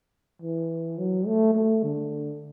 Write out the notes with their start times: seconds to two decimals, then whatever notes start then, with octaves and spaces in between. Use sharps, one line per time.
0.42 E3
0.98 F#3
1.26 A3
1.54 A3
1.83 D3